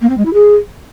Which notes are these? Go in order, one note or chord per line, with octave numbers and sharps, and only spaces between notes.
A#3
C4
G#3
E4
G#4